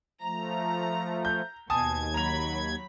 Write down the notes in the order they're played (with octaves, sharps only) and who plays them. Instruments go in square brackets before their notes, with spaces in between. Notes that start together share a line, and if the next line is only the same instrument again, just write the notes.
[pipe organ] F3 A3 [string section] A#5
[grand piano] G6
[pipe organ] D#2 G#6 [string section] B2 [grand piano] G#5 A5 D#6
[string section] F#3 B5 [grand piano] A#5 F7